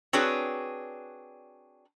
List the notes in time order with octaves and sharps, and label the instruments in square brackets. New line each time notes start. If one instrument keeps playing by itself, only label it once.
[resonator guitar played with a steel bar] C4 D4 F#4 G#4 B4 C#5